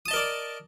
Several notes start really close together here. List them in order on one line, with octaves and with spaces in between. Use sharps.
D#6 A5 D#5 A#4 D5